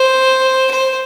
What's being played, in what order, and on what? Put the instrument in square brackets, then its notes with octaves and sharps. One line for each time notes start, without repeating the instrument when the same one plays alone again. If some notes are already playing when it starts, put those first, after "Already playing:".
Already playing: [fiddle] C5
C5